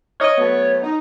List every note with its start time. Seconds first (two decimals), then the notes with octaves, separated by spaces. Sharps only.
0.21 C#5 D#5
0.38 F#3 A3 B3
0.83 D#4